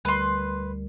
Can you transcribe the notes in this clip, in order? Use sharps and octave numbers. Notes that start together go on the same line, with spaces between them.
D2 G3 A#4 B4 C6